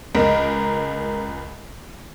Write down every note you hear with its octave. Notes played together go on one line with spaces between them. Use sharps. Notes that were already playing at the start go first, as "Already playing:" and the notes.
C#2 G#3 A#4 B6